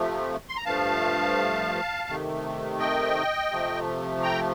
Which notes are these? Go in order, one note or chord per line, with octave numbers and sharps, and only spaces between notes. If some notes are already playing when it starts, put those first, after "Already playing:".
Already playing: C3 F3 A3
C6
A#5
G2 F3 A3 F5 A5
C3 D#3 A3
D#5 G5
C3 F3 A3
G5 A#5